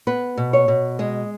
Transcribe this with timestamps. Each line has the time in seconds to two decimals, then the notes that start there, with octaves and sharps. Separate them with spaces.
0.07 B3 B4
0.37 B2
0.53 C#5
0.68 B2
0.99 G#3 D#5